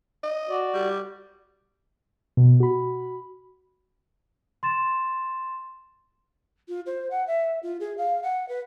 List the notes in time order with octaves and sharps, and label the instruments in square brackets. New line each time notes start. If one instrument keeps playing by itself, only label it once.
[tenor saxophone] D#5
[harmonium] F#4 D5
[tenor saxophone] G3
[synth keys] B2
F#4 B5
[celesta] C6 A6 E7
[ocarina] F4
C5
F#5
E5
F4
G#4
F5
F#5
B4